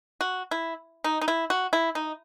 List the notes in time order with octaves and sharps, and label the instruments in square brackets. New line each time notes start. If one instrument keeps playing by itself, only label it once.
[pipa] F#4
E4
D#4
D#4
E4
F#4
E4
D#4